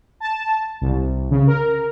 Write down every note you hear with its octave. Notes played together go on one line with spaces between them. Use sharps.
A5
C2
C#3
A#4